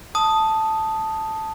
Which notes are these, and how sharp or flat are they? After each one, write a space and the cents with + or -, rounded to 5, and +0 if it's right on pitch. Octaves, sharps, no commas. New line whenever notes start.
A5 +0 D#6 +0